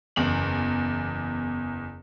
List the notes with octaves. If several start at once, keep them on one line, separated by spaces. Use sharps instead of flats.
F#1 E2 F#7